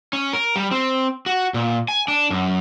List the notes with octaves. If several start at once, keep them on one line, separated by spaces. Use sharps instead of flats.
C#4
A#4
G3
C4
F#4
A#2
G#5
D4
F#2